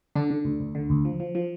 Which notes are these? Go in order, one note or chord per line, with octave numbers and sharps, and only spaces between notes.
D3 D4
D3
D2
D2
D3
D2
F3
F3
F3